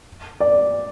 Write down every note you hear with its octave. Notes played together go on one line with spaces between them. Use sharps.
D5